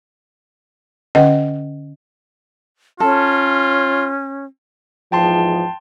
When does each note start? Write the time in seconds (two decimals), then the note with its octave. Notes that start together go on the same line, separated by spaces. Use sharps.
1.15 D3 C#4 B4 D#5 F#5
3.00 C#4 F4 A4
5.12 E2 G#2 F3 G5 A5 C6